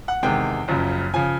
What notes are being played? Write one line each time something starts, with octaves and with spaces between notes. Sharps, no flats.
F#5
E2 C3 D#3 G#3 G5
F#1 F#2 C#3 F3
C#3 F3 G#5